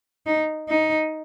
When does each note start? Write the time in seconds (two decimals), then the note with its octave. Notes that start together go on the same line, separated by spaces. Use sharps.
0.26 D#4
0.68 D#4